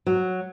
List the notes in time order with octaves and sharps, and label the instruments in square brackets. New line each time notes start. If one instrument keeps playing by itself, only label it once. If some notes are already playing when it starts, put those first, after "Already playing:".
[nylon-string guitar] F#3